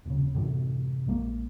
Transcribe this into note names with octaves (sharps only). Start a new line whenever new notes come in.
D#1 C#3
F#2 A2 C3 E3
A#1 G#3 A#3